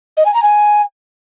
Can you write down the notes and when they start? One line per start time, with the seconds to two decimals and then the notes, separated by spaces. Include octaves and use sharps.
0.17 D#5
0.26 G#5
0.34 A#5
0.43 G#5